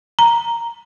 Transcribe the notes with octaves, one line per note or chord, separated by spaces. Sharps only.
A#5